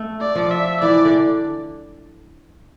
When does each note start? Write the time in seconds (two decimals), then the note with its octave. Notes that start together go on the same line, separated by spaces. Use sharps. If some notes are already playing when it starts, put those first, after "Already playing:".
Already playing: A3
0.21 D5
0.35 F3
0.51 E5
0.81 E3 D5
1.05 D3